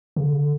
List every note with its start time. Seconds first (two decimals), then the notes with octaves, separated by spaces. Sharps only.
0.16 C#3
0.23 D3
0.33 C#3
0.38 D3